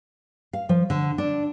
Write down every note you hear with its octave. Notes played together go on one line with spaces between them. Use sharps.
F5
F3
D3
D4